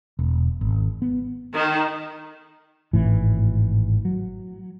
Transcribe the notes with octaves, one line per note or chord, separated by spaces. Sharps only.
E1
G#1
B3
D#3
G#1 A2 E3
F#3